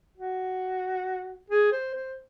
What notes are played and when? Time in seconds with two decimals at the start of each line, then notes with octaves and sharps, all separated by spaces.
0.17 F#4
1.50 G#4
1.72 C5
1.95 C5